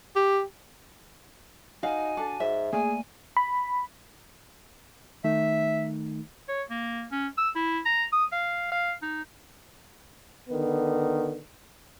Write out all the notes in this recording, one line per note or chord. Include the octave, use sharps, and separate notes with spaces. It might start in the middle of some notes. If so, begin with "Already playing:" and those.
G4
D#4 F#4 F5 G#5
D4 A4
G#2 E5
A3 A#3 G#4 D5 G#5
B5
D#3 A3 D#4 E5
C#5
A#3
C#4
E6
E4
A#5
D#6
F5
F5
D#4
D3 D#3 B3